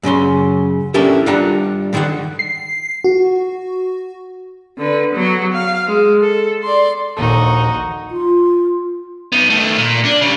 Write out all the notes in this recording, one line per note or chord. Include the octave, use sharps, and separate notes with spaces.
F#2 C#3 C#4 C6
C#4 D4 E4 G4 A4 A#4
G2 G3 D4 F4 F#5 A#5
D3 D#3 G3 E5 F#5
C7
F#4
D3 B4
F#3 B3
F5
G#3
A4
D5 C6
A#1 D#2 D#4 F#4 A4
F4
B3 D#4
D#3 A3
A#2
D4
C#3 G3